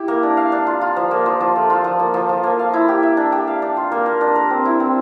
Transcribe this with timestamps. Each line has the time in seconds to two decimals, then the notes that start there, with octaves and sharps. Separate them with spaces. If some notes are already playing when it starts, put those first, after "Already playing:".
Already playing: E4 G4
0.08 A#3
0.23 D4
0.37 F5
0.52 D4
0.67 F4
0.81 F4
0.96 F3
1.11 A#3
1.26 F3
1.40 F3
1.56 A3
1.70 F4
1.84 F3
1.99 A#3
2.14 F3
2.29 F3
2.43 A#3
2.59 F5
2.73 E4
2.88 G4
3.03 E5
3.17 D4
3.32 G4
3.47 F5
3.62 D4
3.77 F4
3.92 A#3
4.06 A#3
4.21 D4
4.36 A#4
4.51 C4
4.65 E4
4.80 C4